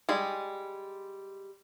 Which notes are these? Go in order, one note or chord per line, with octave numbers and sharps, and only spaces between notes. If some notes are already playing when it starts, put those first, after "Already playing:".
G3 G#3 G#4